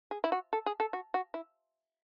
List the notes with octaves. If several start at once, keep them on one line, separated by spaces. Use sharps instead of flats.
G#4
E4
F#4
A4
G#4
A4
F#4
F#4
E4